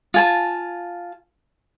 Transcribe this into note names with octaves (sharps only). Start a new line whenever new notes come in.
F4 G#5 A5